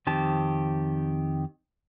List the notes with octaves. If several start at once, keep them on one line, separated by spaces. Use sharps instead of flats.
F2 D#3 C4 G4 A5